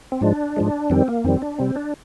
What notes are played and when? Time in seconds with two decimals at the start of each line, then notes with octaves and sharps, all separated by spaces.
0.12 C4
0.21 G#2 F3 G#3 D4
0.57 G#2 F3 G#3
0.90 F2 D#3 G3 C4
1.08 A#3
1.24 F2 D#3 G3 C4
1.42 D4
1.58 C3 G3 C4
1.76 D4